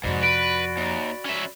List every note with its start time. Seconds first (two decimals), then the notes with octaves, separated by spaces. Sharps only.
0.04 F2 G#2 C3 F#4 D5 B5
0.23 B4 D7
0.77 D#2
1.26 C#4 E5